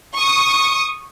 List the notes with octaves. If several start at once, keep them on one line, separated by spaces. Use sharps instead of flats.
C#6 D#6